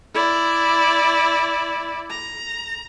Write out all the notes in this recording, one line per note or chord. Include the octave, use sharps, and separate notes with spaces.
E4 D5
A#5